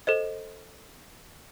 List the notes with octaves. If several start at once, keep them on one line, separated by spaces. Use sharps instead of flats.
A4 C5 D#5